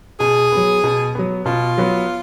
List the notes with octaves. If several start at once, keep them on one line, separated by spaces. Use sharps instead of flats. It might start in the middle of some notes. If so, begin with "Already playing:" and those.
B2 G#4
F#3 B3
B2
F#3 B3
B2 F4
F#3 B3